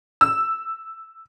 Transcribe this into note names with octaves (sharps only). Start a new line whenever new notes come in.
E6